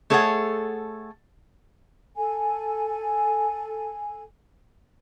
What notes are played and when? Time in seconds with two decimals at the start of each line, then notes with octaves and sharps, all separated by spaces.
0.10 A3 G#4 A4 C#5 E5 F#5
2.16 A4 G#5